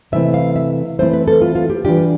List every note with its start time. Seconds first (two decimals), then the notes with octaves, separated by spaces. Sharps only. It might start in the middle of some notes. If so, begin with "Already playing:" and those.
0.12 C3 E3 A3 C4 E4 E5
0.34 F5
0.56 E5
0.99 E3 A3 C4 E4 C5
1.13 B4
1.28 A4
1.41 F4
1.55 F4
1.70 G4
1.85 E3 G3 D4 F4 G4